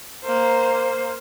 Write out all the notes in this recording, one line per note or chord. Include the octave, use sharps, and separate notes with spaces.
A#3 C5